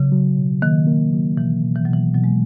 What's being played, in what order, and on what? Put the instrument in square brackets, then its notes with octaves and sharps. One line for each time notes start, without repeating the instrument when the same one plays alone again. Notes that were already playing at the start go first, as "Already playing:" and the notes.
Already playing: [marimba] C#3 [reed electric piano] F#3
[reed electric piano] F#3
B2
[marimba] D#3 [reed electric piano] A#3
[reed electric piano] A#3
F#3
[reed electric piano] B2 [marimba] E3
[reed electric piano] B2
[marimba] E3
F#3
[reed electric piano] B2 [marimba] E3
[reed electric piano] B2 [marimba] F#3
[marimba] G#3